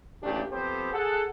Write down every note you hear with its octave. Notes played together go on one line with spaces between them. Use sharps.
A1 A#2 D3 A3 D4 G4
F2 B3 C4 G4 A4 C5
G#4 A4 F#5